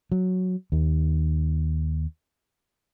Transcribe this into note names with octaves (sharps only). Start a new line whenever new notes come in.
F#3
D#2